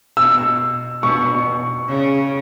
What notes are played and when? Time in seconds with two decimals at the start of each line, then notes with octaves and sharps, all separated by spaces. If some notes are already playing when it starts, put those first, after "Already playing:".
0.17 B2 E6
1.03 B2 C#6
1.88 C#3